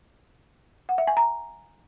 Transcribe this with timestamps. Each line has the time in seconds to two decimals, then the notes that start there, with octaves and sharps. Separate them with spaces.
0.89 F#5
0.98 E5
1.07 G#5
1.17 A#5